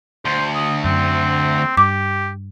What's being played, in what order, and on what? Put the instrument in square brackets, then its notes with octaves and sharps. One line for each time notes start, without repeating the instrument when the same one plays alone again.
[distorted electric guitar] D2 [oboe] C5
[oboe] D#6
[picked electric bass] F#2 [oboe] C4
[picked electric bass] G2 [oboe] G4 [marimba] D6